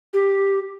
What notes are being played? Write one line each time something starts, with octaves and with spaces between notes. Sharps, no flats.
G4